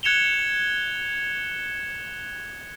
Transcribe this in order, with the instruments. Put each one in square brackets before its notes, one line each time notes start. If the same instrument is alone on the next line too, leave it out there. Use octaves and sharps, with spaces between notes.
[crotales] F#6 G#6 C#7 E7 F7 G7